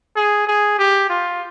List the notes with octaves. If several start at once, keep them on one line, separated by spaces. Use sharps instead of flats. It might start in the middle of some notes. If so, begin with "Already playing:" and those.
G#4
G#4
G4
F4